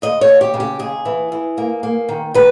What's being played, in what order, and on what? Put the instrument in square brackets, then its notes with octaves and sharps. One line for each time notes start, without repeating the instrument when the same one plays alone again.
[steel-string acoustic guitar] D#2 D#5
C#5
D#2
G4
C#3
G4
D#2 G#4
E3
E3
A#3
A#3
D#3
D#3 B4